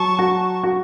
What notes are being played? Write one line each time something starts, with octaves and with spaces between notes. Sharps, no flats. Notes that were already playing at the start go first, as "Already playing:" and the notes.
Already playing: F#3 A5 C#6
F#4
F#4